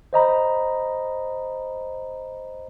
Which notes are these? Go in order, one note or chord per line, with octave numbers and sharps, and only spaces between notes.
C5 D#5 A#5 B5